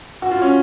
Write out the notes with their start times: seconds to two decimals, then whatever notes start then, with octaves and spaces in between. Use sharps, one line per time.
0.22 F#4
0.31 F4
0.42 C#4